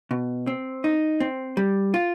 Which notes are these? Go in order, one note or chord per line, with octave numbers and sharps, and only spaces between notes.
B2
C4
D#4
C4
G3
F4